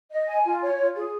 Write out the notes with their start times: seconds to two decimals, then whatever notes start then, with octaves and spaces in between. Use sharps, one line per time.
0.11 D#5
0.28 G#5
0.44 F4
0.62 C#5
0.79 F4
0.96 G#4